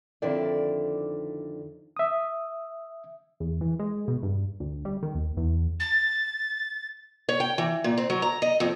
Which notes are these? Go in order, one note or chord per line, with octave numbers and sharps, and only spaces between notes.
F2 D3 D#3 E4 D5
E5 D#6
E2
E3
G#3
B2
G2
D2
G3
D#3
D#2
E2
A6
C#5
G5
E3
A#2
C4
F#3
A#5
D#5
F2